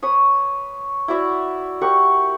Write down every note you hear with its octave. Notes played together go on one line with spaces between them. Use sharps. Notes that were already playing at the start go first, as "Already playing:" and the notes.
B4 C#5 D#6
E4 F#4 D5 E5
G4 A#4 F#5 C#6